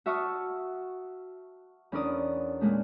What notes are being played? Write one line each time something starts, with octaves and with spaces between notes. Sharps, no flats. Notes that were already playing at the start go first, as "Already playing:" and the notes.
F#4 E5 A5 C#6 D#6 F6
E2 C#4 D4 A#4 D5 D#6
A#2 G#3 A3